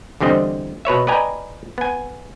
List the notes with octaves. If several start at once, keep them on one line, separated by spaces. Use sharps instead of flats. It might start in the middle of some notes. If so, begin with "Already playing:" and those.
E2 D3 G3 C4 D#5
B2 B4 C#5 E5
B4 D5 D#5 G5 G#5 A#5
B3 G#5